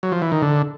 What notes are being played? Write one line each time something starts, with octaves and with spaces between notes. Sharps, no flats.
F#3
F3
E3
D#3
D3